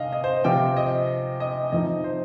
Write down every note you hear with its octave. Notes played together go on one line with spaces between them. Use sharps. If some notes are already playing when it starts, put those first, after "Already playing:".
Already playing: C3 D#5 F5
D#5
C5
C3 F3 C4 F4 G5
D#5
D#5
F2 F3 D#4 D#5
C5